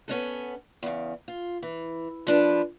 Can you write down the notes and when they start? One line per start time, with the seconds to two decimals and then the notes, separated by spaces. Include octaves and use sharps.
0.08 B3 C#4 D4 A4
0.83 E2 C#3
1.28 F4
1.62 E3
2.27 F3 D4 B4